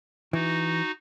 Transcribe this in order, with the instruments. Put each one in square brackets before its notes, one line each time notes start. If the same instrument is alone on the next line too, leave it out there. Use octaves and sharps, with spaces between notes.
[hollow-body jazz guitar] E3 [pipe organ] D#4 F#4